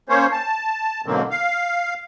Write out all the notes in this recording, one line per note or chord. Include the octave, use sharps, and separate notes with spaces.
A#3 C#4 C5 C#5
A5
G#2 B2 D3 F#3 A#3 C4
F5